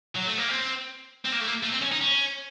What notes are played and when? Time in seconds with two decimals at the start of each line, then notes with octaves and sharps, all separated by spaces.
0.16 F#3
0.27 A3
0.38 A#3
0.49 C4
1.25 C4
1.32 A#3
1.40 A3
1.47 A#3
1.63 A3
1.72 C4
1.82 C#4
1.92 D#4
2.01 C#4